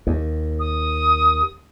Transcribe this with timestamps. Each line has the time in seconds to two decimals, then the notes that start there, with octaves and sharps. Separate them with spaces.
0.07 D#2
0.60 D#6